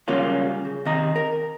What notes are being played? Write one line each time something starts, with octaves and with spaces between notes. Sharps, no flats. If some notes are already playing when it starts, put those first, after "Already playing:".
C#3 F#3 G3 A#3 C#4 F4
C#3
D#2 C3 D#5 A#5
A#4